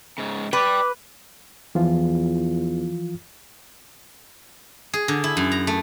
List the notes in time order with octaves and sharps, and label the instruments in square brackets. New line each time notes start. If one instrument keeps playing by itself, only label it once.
[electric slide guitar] G#2 C#3
[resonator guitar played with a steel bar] B4 [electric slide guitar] D5 G5 [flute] D6
[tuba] E2 [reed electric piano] E3 F3 F4
[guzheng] G#4
D3
E4
F#2
A#5
A3